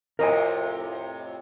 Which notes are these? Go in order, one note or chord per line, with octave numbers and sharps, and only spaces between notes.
F2 A2 C3 A#4 D#5 G#5